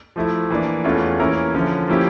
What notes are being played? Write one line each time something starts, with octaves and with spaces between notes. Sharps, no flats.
F3 A3 E4
E3 A#3 D4
E2 E3 A3 C#4 F4
E3 A#3 C#4 E4 A#4
D3 F3 C#4
F3 A#3 C#4 E4 G4